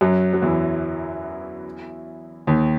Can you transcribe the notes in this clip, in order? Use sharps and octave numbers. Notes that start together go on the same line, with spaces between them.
F#2 F#3
F#3
E2 E3
D#2 D#3